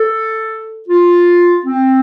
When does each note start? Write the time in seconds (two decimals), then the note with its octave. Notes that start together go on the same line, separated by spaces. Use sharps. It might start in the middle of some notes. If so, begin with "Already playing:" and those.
Already playing: A4
0.88 F4
1.65 C4